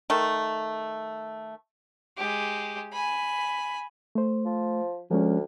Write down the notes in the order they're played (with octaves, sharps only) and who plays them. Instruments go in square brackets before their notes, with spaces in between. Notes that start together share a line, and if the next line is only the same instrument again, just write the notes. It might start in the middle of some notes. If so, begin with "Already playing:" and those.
[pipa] D#3 A3
[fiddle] G#3 G4
G#5 B5
[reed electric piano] A3 C5
[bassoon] F3
[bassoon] D2 [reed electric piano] F3 G#3 C#4